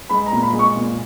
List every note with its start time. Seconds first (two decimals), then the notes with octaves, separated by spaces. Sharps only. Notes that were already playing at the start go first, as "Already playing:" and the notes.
0.09 G#3 B5
0.26 A#5
0.32 A#2
0.43 B5
0.53 G#3
0.59 C#6
0.76 A#2